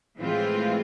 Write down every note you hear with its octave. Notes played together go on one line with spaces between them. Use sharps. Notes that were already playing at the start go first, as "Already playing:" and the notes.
A2 E3 G#3 C4 F4